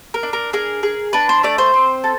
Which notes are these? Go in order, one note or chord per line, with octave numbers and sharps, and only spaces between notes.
A#4
D4
A#4
G#4 A#4
G#4
D4 B4
C5
A3 D5
C5
C4
A4